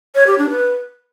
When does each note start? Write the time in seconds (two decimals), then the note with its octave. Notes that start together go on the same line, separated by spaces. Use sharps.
0.15 C#5
0.27 G4
0.38 D4
0.50 B4